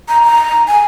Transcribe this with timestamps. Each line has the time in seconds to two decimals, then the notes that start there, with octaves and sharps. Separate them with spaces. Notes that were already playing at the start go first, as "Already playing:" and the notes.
0.09 A#5
0.23 A#5
0.68 G#5